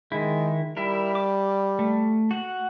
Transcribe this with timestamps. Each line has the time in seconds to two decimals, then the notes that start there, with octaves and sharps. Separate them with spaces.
0.12 D#3 G#3 E4
0.77 G3 E4 A#4
1.15 D6
1.79 A3
2.31 F#4 F#5